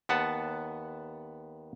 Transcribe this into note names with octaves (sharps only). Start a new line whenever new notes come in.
D#2 B3 F#5 A5